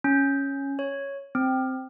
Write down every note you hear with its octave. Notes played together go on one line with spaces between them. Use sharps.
C#4
C#5
C4